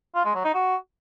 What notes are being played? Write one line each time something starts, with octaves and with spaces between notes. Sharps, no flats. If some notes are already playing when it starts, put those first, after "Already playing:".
F4
G#3
F#3
D#4
F#4